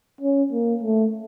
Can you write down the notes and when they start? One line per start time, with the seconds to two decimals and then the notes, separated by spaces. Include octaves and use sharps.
0.21 C#4
0.52 A#3
0.83 A3